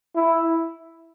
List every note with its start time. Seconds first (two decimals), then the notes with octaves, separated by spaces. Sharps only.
0.15 E4